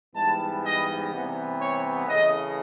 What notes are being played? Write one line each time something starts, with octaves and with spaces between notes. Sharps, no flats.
G#2 E3 G3 B3 A5
D#5
C3 E3 G3 B3
C#5
C#3 E3 A3 D#5